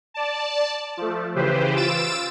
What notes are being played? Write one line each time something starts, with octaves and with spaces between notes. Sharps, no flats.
D5 A5
F3 A3
C#3 E3 G4 B4 C5
F4 E6 A6 D7 E7